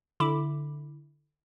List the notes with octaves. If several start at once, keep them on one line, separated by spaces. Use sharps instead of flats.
D3 E4 B5 D6